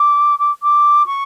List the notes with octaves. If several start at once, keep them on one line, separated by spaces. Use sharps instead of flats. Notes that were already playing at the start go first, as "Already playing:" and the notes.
Already playing: D6
D6
D6
C#6